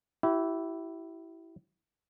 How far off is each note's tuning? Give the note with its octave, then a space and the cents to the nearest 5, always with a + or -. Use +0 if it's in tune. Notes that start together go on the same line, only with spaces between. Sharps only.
E4 +0 G4 -40